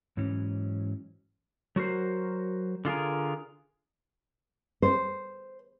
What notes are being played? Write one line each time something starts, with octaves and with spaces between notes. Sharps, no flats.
G#2 E3 F#3 C#4
F#3 F#4 A#4 C5
D3 F4 G#4 A#4
C5